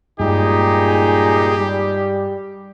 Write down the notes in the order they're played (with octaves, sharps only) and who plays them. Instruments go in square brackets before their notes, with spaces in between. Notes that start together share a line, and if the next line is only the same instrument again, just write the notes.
[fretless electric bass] G2 G#3 [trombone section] A#2 D#4 G#4 [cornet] G4
[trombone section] G3